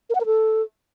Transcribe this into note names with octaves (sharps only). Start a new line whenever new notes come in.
A#4
F#5
A#4
A4